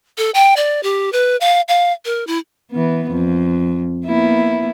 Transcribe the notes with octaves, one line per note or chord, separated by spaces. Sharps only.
A4
G5
D5
G4
B4
F5
F5
A#4
E4
E3 B3
F2
A#3 B3 E4